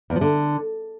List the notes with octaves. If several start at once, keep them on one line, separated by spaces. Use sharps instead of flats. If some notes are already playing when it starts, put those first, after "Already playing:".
E2
F3
D3